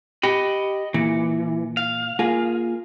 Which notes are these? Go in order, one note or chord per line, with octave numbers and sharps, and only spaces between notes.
G4 D#5 B5
A#2 E3
F5
A#3 F4 G#4